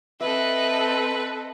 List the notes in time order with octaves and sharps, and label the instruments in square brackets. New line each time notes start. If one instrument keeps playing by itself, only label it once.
[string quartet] C4 A4 D#5 [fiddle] B4 [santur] E5